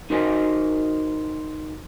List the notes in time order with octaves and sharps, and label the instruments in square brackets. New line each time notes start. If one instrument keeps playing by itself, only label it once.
[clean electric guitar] D#4 F#4 A#4 C5 D#5 G#5